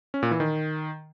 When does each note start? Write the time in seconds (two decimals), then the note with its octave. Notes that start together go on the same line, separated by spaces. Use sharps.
0.14 C#4
0.23 A#2
0.31 E3
0.40 D#3